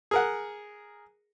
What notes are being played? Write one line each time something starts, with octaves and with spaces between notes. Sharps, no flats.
G#4 A#4 F#5